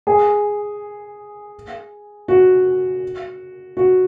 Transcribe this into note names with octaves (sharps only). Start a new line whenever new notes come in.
G#4
F#4
F#4